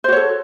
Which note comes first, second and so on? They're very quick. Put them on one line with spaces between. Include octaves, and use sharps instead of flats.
C5 F#4 C#5 A4